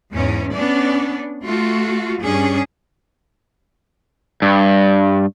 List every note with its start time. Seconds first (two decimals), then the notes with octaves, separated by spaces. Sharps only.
0.13 E2 G#2 C#4
0.53 B3 C#4 D4 D5
1.43 A3 F4 F#4
2.23 G2 C#4 D4 G#4
4.42 G2